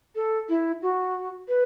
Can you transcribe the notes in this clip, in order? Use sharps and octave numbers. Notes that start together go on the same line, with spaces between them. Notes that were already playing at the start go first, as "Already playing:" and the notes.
A4
E4
F#4
B4